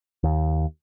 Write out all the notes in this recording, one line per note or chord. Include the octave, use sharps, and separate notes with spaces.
D#2